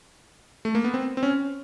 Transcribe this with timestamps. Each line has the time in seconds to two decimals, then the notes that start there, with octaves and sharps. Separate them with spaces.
0.65 A3
0.75 A#3
0.84 B3
0.94 C4
1.17 C4
1.23 C#4